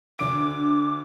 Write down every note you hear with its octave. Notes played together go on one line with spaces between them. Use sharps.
D2 D3 D6 D7